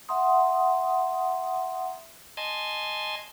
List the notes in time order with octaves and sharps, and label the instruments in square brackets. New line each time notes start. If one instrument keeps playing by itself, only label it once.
[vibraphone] E5 F#5 A#5 C6 D#6
[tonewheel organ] D#5 G#5 A5 C6